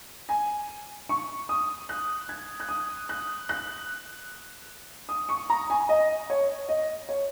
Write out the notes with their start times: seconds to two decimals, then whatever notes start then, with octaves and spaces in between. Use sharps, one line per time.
0.29 G#5
1.09 C#6
1.49 D#6
1.89 F#6
2.29 G#6
2.60 F#6
2.69 D#6
3.09 F#6
3.49 F#6
5.09 D#6
5.29 C#6
5.50 A#5
5.70 G#5
5.89 D#5
6.30 C#5
6.69 D#5
7.09 C#5